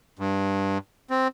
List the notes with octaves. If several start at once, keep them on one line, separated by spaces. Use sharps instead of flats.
G2
C4